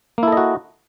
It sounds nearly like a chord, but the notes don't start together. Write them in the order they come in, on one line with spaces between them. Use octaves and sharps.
A#3 E4 A4 D#5 F#4